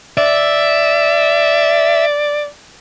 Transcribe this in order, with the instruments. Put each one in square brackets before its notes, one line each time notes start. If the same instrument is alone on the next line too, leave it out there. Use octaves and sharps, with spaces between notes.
[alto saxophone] D5 [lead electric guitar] E5